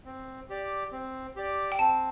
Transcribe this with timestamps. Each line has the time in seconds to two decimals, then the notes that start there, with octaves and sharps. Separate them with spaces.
0.06 C4
0.49 G4 D5
0.92 C4
1.36 G4 D5
1.72 G5
1.79 C4 A5